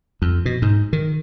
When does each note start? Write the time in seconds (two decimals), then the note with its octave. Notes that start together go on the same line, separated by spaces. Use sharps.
0.22 F2
0.46 B2
0.62 G#2
0.93 D#3